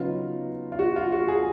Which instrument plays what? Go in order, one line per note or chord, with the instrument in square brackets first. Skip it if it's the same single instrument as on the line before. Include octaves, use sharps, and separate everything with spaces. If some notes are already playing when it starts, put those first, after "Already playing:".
Already playing: [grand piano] C#3 F#3 B3 D#4 F4
F4
F#4
F4
F#4
G#4